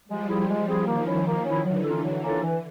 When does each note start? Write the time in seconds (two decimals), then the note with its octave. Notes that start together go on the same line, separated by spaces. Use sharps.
0.08 F3 G3 G#3
0.28 C4 E4 G#4
0.48 G#3
0.67 C4 E4 G#4
0.86 D#3 F3 A#3
1.06 C#4 E4
1.26 A#3
1.45 C#4 E4
1.64 D3 E3 F#3
1.84 A#3 C#4 F4 A4
2.03 F#3
2.22 A#3 C#4 F4 A4
2.42 E3